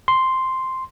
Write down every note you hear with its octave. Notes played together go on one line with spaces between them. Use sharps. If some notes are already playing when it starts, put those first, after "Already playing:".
C6